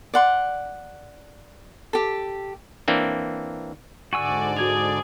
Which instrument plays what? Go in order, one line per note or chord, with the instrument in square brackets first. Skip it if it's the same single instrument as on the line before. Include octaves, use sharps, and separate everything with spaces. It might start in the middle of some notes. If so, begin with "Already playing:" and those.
[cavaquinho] D5 F#5 C6
G4 A4
[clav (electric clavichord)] E3 A#3 C4 D4
[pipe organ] G#2 D3 D5 [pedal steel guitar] F#4 G#5 E6 [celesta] C#6
[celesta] F#4 G#6 F7 [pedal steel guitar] G#4